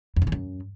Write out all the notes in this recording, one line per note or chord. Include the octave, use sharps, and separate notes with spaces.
F2
C#3
E3
F#2